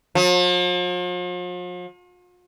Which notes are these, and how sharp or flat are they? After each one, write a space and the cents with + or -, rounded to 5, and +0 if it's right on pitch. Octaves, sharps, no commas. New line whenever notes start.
F3 +45